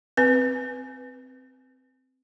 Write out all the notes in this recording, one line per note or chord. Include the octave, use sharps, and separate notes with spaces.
C4 B4